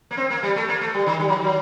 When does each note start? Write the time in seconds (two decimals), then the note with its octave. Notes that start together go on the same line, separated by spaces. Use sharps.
0.11 A#3
0.17 C4
0.30 A#3
0.43 G3
0.56 A3
0.68 A#3
0.81 A3
0.94 G3
1.06 D#3
1.20 G3
1.28 F#3
1.36 D#3
1.44 F#3